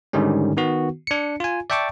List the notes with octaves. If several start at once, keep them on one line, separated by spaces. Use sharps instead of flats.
G#2 D3 D#3 G3 C#4
D#3 B3 F#4
D4 C#7
F4 G#5
D5 E5 G5 A5 C#6 D6